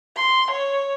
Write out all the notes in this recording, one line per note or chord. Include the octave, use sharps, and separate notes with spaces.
C6
C#5